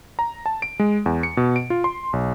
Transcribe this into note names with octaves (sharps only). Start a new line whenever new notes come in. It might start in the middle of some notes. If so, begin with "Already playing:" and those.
A#5
A5
D7
G#3
E2
C#7
B2
D7
F4
C6
B1